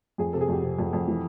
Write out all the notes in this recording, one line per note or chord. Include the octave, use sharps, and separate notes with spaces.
F2 G#4
C3 A4
G#4
F2 G4
C3
F2
F2
E3